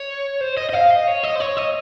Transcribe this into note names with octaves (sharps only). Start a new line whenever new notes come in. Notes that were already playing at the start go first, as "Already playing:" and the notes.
Already playing: C#5
C5
D#5
D#5
F5
D#5
C#5
D#5
C5
C#5
D#5